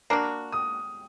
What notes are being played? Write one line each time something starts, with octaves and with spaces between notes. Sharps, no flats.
A#3 D4 F#4 F6
D#6